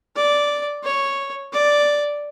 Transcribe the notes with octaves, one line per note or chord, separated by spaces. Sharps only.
D5
C#5
D5